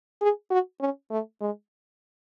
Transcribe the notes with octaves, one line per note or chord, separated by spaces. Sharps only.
G#4
F#4
C#4
A3
G#3